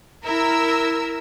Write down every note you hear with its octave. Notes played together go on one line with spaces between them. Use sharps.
E4 A#4 E6